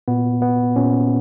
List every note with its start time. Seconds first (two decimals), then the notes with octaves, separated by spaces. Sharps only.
0.08 A#2 B3
0.42 B3
0.76 A#2 C#4